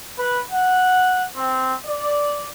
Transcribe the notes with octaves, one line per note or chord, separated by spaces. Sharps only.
B4
F#5
C4
D5